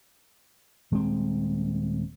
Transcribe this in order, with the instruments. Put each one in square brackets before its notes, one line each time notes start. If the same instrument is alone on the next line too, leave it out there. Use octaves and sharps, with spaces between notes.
[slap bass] D#1 G#3 A3 C4